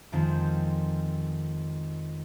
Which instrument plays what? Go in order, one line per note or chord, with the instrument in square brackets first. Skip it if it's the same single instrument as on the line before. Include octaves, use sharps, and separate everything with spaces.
[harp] F2 D#3 F3 G#3 C4